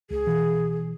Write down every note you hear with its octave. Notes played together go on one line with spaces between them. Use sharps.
C#2 G#4
B2 E3